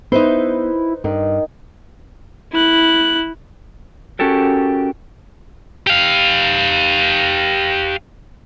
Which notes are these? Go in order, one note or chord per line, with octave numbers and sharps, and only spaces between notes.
B3 D#4 E4 B4 C5
G2 D#3
E4 F#6
C#4 F#4 G4 A4 A#4
G4 F5